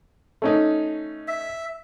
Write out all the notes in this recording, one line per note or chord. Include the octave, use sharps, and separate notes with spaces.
A3 C#4 D#4
E5